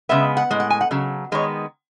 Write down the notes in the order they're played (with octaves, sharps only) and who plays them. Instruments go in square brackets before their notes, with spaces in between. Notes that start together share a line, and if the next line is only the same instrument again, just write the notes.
[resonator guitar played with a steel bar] C#3 G#3 B3 E5
F#5
A2 G#3
F#5
G#5
F#5
C#3 F#3
D#3 G#3 B3 C#5